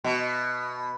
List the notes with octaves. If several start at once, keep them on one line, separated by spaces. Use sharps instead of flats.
B2